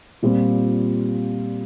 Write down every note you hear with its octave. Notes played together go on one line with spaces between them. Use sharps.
A#2 G3 C4 F4